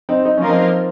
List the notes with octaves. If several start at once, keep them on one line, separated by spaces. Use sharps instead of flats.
C4 D#4
D#4
F3 A#3 C#4 F4 A#4
C4 D#4